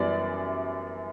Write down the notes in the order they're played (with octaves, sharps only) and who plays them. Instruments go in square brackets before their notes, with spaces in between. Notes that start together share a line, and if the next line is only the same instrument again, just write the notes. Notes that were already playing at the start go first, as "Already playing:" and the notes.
Already playing: [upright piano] F#2 E3 G3 B3 D5